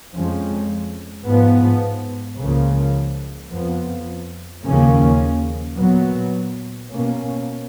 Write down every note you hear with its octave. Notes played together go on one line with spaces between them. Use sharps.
F2 F3 G#3 C#4
G#2 F3 B3
C#2 C#3 F3 A#3
F2 F3 B3
D#2 C#3 F3 A#3 C#4
A#2 F#3 B3
B2 A#3 C#4